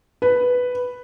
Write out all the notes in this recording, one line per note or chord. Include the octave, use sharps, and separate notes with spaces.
B4